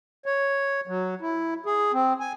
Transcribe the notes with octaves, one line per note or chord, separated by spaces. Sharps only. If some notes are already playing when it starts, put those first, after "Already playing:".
C#5
F#3
E4
G#4
C4
G#5